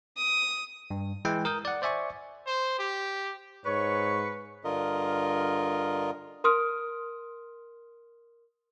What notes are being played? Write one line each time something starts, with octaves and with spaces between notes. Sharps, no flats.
D#6
G2
E3 G#3 G5
A#4 D#6 G6
D5 F#5
C5 D5 E5 G#5 C#6
C5
G4
G#2 B4 C#5 C#6
G2 D3 F4 A#4 D#5
A#4 C6 D#6 F6 D7